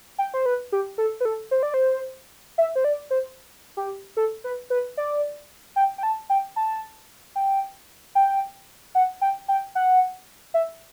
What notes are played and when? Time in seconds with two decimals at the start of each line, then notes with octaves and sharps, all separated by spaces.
0.18 G5
0.34 C5
0.46 B4
0.72 G4
0.98 A4
1.20 B4
1.25 A4
1.51 C5
1.63 D5
1.74 C5
2.58 E5
2.76 C5
2.84 D5
3.10 C5
3.77 G4
4.17 A4
4.44 B4
4.70 B4
4.97 D5
5.76 G5
5.98 G5
6.03 A5
6.30 G5
6.56 A5
7.36 G5
8.15 G5
8.95 F#5
9.21 G5
9.48 G5
9.75 F#5
10.54 E5